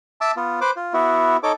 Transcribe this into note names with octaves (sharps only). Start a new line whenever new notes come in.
E5 A5 D6 E6
B3 F4
B4 C5 D6
F4
B3 E4 F#4
D#4 A4 C#5 D6